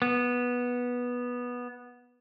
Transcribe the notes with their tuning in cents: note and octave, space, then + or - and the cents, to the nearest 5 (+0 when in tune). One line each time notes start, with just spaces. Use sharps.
B3 -10